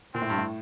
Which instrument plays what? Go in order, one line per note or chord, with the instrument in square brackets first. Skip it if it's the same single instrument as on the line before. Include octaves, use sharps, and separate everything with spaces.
[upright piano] A#2 [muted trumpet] C4
[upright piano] A2
G2
A2